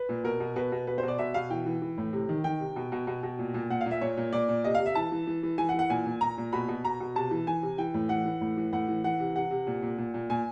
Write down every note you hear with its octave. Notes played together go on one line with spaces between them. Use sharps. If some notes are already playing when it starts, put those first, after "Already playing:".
Already playing: B4
A#2
B2 A#4
B2
B2 B4
B2
B2 B4
C5
B2
D5
B2 E5
B2 F5
E3 G5
E3
E3
A2
C3
D#3
D#3 G5
C3
B2
B2
B2
B2
A#2
A#2
A#2 F#5
F5
A#2
E5
A#2 C#5
A#2
A#2 D5
A#2
C3 D#5
F5
C3
E5
E3 A5
E3
E3
E3
E3 G#5
F#5
E3
F#5
A#2 G#5
A#2
A#2 A#5
A#2
B2 B5
B2
B2 A#5
B2
C3 A5
E3
E3 G#5
C3
E3 G5
A2
E3 F#5
E3
A2
E3
A2 F#5
E3
E3 F#5
C3
C3 F#5
C3
A#2
A#2
A#2
A#2
A#2 G#5